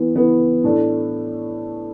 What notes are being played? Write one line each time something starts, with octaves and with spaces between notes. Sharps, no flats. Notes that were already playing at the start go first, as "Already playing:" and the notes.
Already playing: E3 B3 E4
E3 B3 E4
A2 A3 D4